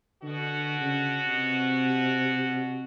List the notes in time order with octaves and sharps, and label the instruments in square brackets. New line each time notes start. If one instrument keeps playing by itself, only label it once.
[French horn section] B2 F#4 [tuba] D3
[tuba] C#3
C3